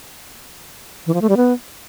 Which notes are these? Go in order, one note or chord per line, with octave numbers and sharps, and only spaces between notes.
E3
F3
A3
G3
B3